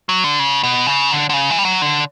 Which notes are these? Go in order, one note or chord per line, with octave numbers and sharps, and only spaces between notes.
F#3
D3
C#3
B2
C#3
D3
D3
C#3
E3
G3
F#3
D3